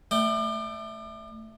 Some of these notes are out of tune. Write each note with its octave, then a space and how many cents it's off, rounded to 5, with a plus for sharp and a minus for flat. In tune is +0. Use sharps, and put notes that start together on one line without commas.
A3 +0 D5 +40 G5 +0